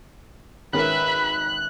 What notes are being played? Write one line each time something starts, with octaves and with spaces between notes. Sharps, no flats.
G#1 C#4 A#4 B4 E5 B5 F#6